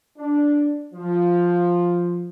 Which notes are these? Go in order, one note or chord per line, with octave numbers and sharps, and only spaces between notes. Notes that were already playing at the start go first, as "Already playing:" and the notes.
D4
F3